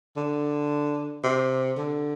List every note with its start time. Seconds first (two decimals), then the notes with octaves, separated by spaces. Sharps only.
0.17 D3
1.24 C3
1.77 D3